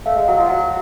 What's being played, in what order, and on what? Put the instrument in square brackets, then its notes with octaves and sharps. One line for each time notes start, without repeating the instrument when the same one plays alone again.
[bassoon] A3 [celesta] F5
[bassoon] G#3
[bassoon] F#3 [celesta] F#5
[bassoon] F3
F#3